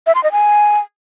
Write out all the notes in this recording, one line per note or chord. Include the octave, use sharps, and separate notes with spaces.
E5
C6
D#5
G#5